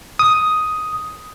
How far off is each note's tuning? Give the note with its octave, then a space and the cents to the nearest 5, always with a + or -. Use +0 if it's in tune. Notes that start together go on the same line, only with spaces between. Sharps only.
D#6 +5